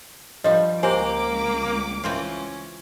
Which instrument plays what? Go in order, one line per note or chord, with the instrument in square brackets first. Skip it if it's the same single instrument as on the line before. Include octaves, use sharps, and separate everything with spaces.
[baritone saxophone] G2 [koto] F3 G3 [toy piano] D#5
[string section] C#2 D6 [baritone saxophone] A#3 [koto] C4 [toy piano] G4 C5 G#5
[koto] E3 C4 F4 [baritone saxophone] C#4